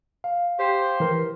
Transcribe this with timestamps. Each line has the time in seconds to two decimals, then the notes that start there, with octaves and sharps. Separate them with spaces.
0.24 F5
0.59 G4 C5
1.00 E3 A#4